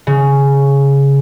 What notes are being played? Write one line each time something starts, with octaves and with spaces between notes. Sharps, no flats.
C#3